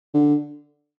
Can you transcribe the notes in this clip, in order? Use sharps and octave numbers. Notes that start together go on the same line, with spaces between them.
D3